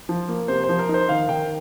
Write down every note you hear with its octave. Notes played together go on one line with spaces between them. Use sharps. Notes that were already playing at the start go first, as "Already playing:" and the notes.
F3
A#3
C3 C5
C5
F3
A#4
D#4
C5
D#3 F5
D#3 G5